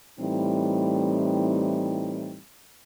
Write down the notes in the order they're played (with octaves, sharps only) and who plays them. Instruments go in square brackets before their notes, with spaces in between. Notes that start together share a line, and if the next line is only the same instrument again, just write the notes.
[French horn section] A2 E3 G3 C4 D#4